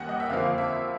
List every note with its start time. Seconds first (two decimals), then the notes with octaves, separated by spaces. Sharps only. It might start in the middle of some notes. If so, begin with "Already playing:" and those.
Already playing: D#2 D#3 G3 F#5 G#5
0.09 D#5
0.20 E5
0.30 F2 D3 F3 A#3 F5
0.58 E5